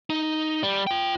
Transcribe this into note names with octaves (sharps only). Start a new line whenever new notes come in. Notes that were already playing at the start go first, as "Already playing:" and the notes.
D#4
G3
F4 G5